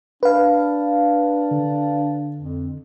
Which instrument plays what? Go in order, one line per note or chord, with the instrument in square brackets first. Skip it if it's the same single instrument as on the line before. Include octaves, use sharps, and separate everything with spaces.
[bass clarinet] D4 [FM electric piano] B4 F5
[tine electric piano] D3
[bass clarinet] F2